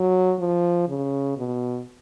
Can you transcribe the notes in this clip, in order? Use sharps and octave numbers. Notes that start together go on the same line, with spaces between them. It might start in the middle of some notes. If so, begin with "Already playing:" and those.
Already playing: F#3
F3
C#3
B2